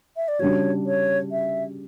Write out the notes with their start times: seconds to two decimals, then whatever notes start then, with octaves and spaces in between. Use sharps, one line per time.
0.17 E5
0.28 D5
0.39 C#3 G3 D4 F#4 C#5
0.86 C#5
1.32 E5